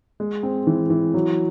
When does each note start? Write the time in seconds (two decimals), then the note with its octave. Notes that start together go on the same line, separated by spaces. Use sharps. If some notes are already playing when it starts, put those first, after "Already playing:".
0.20 G#3
0.43 C4
0.67 E3
0.90 E3
1.14 F#3